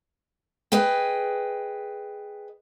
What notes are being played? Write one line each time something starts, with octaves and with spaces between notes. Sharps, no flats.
G#4 B4 D#5 G5